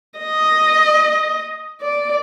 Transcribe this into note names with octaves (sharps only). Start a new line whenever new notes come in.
D#5
D5